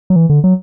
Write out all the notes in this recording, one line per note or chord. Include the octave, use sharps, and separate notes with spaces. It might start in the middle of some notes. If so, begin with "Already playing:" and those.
F#3
E3
D3
F#3